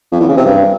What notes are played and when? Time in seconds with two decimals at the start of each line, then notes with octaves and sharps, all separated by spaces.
0.12 F2
0.20 E2
0.29 C#3
0.37 C3
0.46 G2